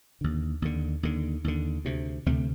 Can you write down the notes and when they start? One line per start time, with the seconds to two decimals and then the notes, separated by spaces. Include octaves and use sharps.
0.21 D#2 D3
0.62 D#2 D3
1.03 D#2 D3
1.44 D#2 D3
1.85 D2 C3
2.26 D2 C3 A3 C4